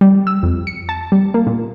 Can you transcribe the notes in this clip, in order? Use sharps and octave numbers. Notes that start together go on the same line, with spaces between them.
G3
E6
F2
C#7
A5
G3
A#3
A#2